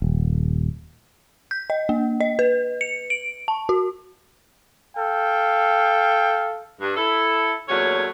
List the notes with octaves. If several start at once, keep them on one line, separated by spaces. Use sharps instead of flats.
D#1
G6
D#5
A#3
D#5
B4
C#7
D7
A5
F#4
A4 F5 G5
G2
E4 A4
E2 A#2 F#3 A3 C#4 C#5